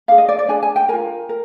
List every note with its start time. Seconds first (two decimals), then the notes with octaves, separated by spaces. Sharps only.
0.08 D4 G#4 F5
0.18 D#5
0.29 D5
0.39 D5
0.49 D4 G#4 G#5
0.63 G#5
0.76 G5
0.89 F4 A#4 G#5
1.29 A#4